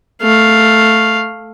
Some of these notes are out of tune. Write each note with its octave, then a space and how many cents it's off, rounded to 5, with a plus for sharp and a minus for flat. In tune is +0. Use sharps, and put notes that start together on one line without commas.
A3 +5 F5 +0